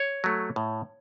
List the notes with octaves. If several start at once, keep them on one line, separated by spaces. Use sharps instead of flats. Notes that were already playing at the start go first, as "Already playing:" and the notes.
Already playing: C#5
F#3 A3
A2